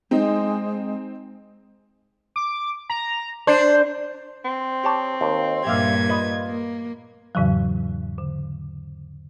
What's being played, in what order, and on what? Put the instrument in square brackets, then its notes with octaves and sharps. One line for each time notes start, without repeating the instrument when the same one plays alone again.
[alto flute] G#3 [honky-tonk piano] C4 D#4
[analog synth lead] D6
A#5
[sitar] D4 [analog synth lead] C5
[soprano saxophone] C4
[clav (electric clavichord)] G4 C#5 A5
D#2
[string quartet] G2 A#2 G#6 [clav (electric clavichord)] G4 E5 F5
[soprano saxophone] F4 [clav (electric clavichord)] B4 D#5
[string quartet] A#3
[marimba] E2 G#2 C#3 E3 F#3
D3